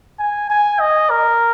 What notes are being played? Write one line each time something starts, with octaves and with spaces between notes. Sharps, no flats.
G#5
G#5
D#5
A#4